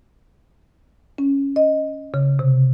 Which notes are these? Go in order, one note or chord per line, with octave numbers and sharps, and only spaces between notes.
C#4
D#5
C#3
C3